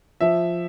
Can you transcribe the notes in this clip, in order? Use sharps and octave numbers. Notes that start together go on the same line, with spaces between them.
F3 E5